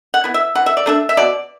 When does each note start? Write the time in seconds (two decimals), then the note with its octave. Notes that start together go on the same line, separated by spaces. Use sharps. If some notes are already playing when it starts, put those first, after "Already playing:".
0.14 F#5
0.24 B3 E4
0.34 E5
0.55 E3 F#5
0.66 E5
0.77 D5
0.86 A3 D4 E5
1.09 E5
1.17 B2 D5